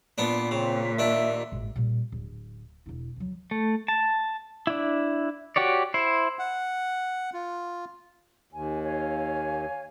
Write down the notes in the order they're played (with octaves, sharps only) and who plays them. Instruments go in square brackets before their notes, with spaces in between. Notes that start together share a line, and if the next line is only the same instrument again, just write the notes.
[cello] A#2 [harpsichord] B3 D4
[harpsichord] C#3 [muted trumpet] C4
[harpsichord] D#2 D4 [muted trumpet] E5
[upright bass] G#1 A2
A#2 G3
D1
E1 E4
D2 F#3
[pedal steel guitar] A3
A5
D4 E4
F#4 G4 C#5 D5
E4 C5
[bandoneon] F#5
F4
[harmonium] D#2 [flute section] G#5
[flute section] C#5 F5 G#5